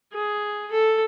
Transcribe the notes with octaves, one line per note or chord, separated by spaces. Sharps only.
G#4
A4